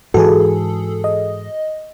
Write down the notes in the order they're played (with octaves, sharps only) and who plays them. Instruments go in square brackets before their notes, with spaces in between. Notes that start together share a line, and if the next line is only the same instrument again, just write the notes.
[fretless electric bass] G#2 E3 [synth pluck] F#4 [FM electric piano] G#4 A4
[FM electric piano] D#5